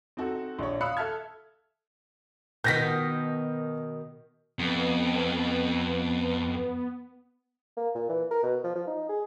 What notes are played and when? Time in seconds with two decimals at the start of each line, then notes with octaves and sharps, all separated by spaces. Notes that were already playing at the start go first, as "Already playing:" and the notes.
0.17 C4 D#4 F#4 A4
0.59 A#1 D4 C#5
0.81 F5 B5 D#6 E6 F#6 C#7
0.97 A4 E5 A5 F6 G#6
2.64 B2 D#3 G6 A#6 B6
4.59 F2 B3
7.77 A#3
7.95 A#2
8.09 E3
8.31 A#4
8.43 B2
8.64 F3
8.76 F3
8.87 D#4
9.09 G#4